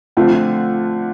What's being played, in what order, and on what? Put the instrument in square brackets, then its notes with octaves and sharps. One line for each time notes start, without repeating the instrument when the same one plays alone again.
[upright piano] D3 F3 A3 C4 [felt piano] F4